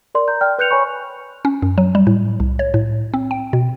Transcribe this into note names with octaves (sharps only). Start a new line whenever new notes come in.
A#4 D5 C6
A#5 G6
D5 G5 F6
B4 F#6 G6 C#7 F7
C#5 G#5 B5 C#6
C#4
F#2
F#3
G3
A2
C2
C#5
A2
C4
G5
B2